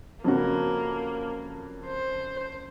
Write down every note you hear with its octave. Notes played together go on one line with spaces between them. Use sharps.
F2 C#3 A#3 F#4
C5